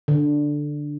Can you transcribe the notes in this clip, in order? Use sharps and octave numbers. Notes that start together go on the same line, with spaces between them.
D3